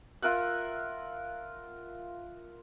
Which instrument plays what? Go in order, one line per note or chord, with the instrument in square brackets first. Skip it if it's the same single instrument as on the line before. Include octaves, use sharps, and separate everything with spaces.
[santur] F4 A#4 E5 F#5